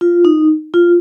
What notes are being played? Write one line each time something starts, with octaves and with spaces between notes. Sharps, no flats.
F4
D#4
F4